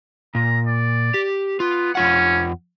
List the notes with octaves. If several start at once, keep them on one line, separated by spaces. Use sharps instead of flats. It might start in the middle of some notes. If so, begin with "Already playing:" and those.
A#2 A#5
D5
G4
B3 F4
F2 C#4 F4 F#5